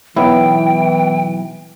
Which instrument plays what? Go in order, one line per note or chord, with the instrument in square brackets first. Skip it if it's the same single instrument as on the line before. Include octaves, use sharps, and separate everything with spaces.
[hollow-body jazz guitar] B1 [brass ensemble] E3 [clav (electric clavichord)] B3 E4 [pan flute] G5